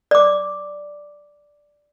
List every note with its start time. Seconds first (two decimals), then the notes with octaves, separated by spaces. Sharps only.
0.11 D5 D6